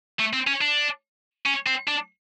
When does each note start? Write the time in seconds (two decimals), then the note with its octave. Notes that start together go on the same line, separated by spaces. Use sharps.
0.19 A3
0.33 C4
0.47 C#4
0.61 D4
1.46 C#4
1.67 C4
1.88 D4